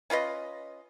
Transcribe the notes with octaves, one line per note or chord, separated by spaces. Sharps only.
C#4 F4 B4 D#5